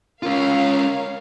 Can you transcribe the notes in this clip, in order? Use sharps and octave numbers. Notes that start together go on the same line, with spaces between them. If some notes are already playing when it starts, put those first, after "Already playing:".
C#4 F4 A#4 C#5 F5